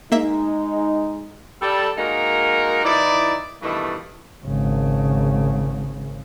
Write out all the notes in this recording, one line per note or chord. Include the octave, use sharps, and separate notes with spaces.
G#3 A#3 D#4 E5 B6
G3 A4
G#3 A#3 D#4 F#4 A#4
E3 D#4 E4 D5
G2 B2 D#3 E3 A3
G#1 C#3